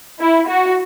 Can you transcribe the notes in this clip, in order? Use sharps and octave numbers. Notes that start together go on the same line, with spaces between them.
E4
F#4